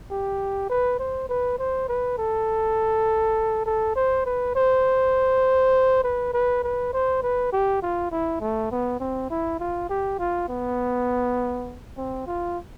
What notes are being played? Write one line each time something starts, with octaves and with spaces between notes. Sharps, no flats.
G4
B4
C5
B4
C5
B4
A4
A4
C5
B4
C5
B4
B4
B4
C5
B4
G4
F4
E4
A3
B3
C4
E4
F4
G4
F4
B3
C4
F4